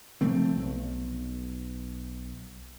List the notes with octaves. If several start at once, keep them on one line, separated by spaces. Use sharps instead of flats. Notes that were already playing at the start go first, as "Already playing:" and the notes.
C3 F3 A3 C4
B1